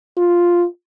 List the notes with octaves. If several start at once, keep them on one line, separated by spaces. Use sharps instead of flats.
F4